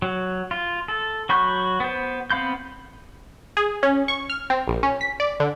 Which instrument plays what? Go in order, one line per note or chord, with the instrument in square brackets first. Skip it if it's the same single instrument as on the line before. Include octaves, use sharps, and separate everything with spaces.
[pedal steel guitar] F#3
F4
A4
F#3 F#4 B5 C#6 G6
B3 C5
B3 C4 F5 B5 G6
[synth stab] G#4
C#4
C#6
F6
C4
A#1
C#4
B6
D5
D3